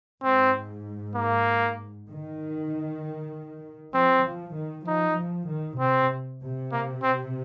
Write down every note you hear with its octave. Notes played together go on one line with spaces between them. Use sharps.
G#2 C4
A#3
D#3
F3 C4
F3
D#3
F3 D#4
F3
D#3
C3 C4
C3
A#3
C4